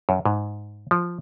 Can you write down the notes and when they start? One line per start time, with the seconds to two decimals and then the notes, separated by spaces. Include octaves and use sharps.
0.09 F#2
0.25 G#2
0.91 F3